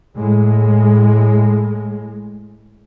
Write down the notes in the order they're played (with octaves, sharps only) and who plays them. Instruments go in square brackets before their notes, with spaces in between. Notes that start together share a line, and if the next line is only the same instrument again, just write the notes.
[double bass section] A2 G#3